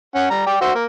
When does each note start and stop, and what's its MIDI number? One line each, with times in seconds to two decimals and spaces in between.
0.15 0.28 61
0.15 0.28 78
0.30 0.42 55
0.30 0.42 82
0.46 0.60 74
0.46 0.60 79
0.61 0.72 66
0.61 0.72 72
0.61 0.72 76
0.75 0.85 58